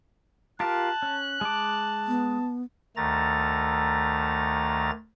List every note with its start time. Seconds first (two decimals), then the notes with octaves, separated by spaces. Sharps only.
0.60 F4 G4 A#4 A5 F#6
1.03 C#4
1.41 G#3 A5 D6
2.08 B3
2.96 D2 D#3 A3 A#5 A6